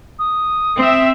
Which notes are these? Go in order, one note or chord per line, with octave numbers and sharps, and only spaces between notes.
D#6
C4 E5